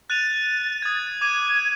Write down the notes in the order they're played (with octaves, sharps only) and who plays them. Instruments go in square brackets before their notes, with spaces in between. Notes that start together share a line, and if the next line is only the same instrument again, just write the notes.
[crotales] F#6 D#7 F7 [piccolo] A6
[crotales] D#6 G#6
[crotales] D6 D#7 [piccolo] G#6